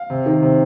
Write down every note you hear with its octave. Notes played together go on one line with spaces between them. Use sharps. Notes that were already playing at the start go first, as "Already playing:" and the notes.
Already playing: F5
C3
D#3
C3